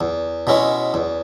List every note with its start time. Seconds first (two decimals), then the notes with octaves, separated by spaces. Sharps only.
0.01 E2
0.47 B2 G#3 C#4 E4
0.94 E2